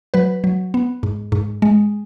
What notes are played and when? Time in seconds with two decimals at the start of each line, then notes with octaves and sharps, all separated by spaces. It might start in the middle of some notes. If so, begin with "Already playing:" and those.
0.14 F#3 B4
0.44 F#3
0.74 B3
1.03 G#2
1.32 G#2
1.62 G#3